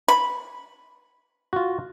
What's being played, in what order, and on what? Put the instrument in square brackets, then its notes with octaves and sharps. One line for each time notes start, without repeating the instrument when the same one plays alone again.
[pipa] B5
[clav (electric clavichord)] F4 F#4